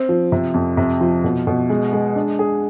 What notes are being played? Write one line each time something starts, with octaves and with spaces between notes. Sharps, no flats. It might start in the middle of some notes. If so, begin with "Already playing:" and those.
Already playing: C4
F3
C3
F2
C3
F3
B2
B2
G#3
G#3
D4
G#4